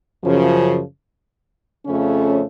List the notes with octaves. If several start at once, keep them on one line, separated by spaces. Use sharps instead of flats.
F#2 C#3 F3
F2 C#3 F3 A3 C#4